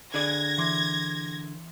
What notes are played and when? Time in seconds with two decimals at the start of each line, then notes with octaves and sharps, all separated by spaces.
0.14 D3 G#4 D5 G#6 A#6
0.58 E3 C6 D6